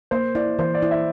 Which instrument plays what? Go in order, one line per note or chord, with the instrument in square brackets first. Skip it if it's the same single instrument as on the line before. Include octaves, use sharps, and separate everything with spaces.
[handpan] A#3 [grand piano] C5
[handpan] E4 [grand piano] D5
[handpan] E3 [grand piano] C5
[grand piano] D5
[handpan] E4
[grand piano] E5